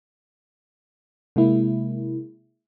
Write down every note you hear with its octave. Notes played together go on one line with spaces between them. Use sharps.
C3 G#3 A#3 E4